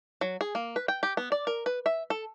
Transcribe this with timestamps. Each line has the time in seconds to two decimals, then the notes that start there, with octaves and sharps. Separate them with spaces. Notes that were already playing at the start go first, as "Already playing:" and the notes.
0.21 F#3
0.41 G#4
0.55 A#3
0.76 B4
0.88 G5
1.03 G4
1.17 B3
1.32 D5
1.47 A#4
1.66 B4
1.86 E5
2.10 A4